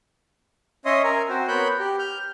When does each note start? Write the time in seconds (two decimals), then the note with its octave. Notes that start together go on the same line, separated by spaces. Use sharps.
0.85 C#4 C#5 D#5 E5 C6 D#6
1.04 A#4 G#5 A#5
1.29 C4 F#4 C5
1.48 B3 A#4 C#5 B5 F#6 G6
1.79 G4
1.99 F6 G6